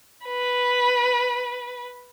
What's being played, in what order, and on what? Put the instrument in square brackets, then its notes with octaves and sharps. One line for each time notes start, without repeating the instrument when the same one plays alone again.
[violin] B4